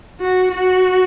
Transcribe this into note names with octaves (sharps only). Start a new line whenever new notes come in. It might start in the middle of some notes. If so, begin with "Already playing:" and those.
F#4
F#4